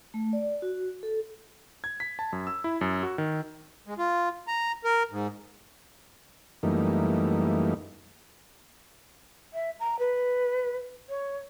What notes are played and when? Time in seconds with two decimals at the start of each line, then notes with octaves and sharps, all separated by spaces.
0.14 A3
0.33 D5
0.62 F#4
1.03 A4
1.84 G#6
2.00 B6
2.19 A5
2.33 F#2
2.47 E6
2.64 E4
2.81 F#2
3.03 F#4
3.18 D#3
3.87 G#3
3.98 F4
4.48 A#5
4.84 A#4
5.11 G#2
6.63 F#2 E3 G3 A3 A#3 D#4
9.53 E5
9.80 A#5
9.99 B4
11.09 C#5